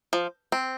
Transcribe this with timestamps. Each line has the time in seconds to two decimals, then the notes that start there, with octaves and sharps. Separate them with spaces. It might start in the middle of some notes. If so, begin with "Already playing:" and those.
0.13 F3
0.52 C4